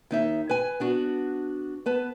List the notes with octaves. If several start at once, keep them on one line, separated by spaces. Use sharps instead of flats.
D#2 D#4 E5
B4 G#5
B3 D4 F#4
B3 B4 A5